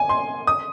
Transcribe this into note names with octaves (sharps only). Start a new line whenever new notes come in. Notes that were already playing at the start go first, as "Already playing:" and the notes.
Already playing: G#5
C6
D#6